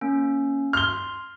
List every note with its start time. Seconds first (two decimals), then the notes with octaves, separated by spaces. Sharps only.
0.01 A#3 C#4
0.73 C6 F6 G7